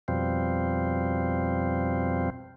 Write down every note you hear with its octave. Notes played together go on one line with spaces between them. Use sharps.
F2 B2 F3 G3 C4